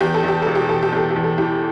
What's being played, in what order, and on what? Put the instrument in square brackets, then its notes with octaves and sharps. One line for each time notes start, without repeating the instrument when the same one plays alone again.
[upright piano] E2 [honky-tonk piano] G4
[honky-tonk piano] A4
[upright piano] E2 [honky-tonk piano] G4
[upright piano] E1 [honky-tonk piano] A4
[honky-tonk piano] G4
[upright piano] E1 [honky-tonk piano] A4
[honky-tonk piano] G4
[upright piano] E2 [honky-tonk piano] A4
[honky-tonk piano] G4
[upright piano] E2
[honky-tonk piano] A4
[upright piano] E3 [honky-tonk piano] G4